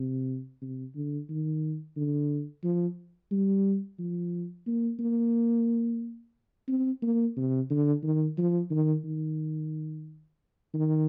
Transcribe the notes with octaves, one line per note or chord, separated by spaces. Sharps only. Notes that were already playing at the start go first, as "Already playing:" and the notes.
Already playing: C3
C3
D3
D#3
D3
F3
G3
F3
A#3
A#3
C4
A#3
C3
D3
D#3
F3
D#3
D#3
D#3